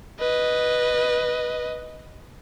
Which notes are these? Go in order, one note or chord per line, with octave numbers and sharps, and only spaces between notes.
B4 D#5